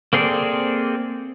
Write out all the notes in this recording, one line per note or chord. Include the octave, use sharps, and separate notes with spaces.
A#3 C4 G#4 A4 D5